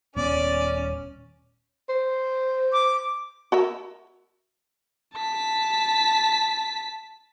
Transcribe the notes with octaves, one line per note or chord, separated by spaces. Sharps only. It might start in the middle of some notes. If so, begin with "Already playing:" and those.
D#1 B3 C#4 D5
C5
D6
F#4 A#4 E5
A5 B6